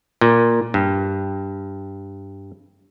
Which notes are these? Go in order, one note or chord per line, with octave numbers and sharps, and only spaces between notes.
A#2
G2